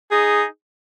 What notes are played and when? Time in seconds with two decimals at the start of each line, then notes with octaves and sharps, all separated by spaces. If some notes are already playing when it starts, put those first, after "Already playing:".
0.11 D#4 G#4